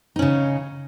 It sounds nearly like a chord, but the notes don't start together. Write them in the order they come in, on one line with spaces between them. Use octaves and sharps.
D#4 C#4 C#3